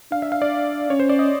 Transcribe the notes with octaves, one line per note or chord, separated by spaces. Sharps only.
D4 F5
E5
F5
D5
C#4 C#5
C5
D5
D#5